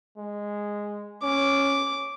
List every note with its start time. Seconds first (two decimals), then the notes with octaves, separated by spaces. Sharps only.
0.18 G#3
1.23 C#4 D6